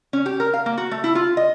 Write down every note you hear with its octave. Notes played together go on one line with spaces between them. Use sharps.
C#4
G4
A#4
F5
A#3
F#4
A3
E4
F4
D#5